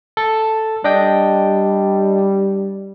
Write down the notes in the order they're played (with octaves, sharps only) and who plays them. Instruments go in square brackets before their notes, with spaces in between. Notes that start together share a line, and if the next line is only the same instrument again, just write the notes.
[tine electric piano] A4
[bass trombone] G3 [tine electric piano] D4 D#5 G5